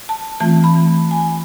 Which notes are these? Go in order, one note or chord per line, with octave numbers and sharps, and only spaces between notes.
A5
E3 A3 C4 F4 A5
B5
G#5